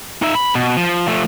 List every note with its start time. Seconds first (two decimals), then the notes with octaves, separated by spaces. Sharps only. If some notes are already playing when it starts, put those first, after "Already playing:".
0.22 D#4 E5
0.35 B5
0.55 B2
0.77 F3
1.08 F3 A3